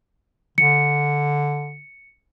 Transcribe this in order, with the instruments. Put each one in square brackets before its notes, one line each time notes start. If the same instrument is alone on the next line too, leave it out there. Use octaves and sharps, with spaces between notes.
[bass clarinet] D3 [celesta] C#7